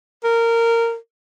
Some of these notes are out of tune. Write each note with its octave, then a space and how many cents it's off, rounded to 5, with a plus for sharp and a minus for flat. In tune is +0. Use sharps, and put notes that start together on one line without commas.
A#4 -15